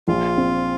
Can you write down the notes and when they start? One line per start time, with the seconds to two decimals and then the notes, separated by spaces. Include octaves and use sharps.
0.08 A#1 F4
0.37 C4